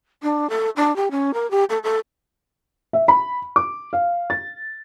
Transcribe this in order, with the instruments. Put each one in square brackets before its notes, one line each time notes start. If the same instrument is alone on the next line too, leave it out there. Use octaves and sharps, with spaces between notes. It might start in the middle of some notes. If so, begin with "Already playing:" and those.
[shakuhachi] D4
A4
D4
G4
C#4
A#4
G4
A4
A4
[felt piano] E5
B5
D6
F5
A6